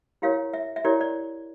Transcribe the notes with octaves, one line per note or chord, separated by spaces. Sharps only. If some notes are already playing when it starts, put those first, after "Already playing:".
E4 G4 A#4 C#5 F5
E5
E5
E4 G4 A#4 C#5 D5
D5